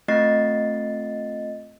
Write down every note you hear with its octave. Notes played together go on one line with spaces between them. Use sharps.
A3 C4 F4 D#5 A6 C7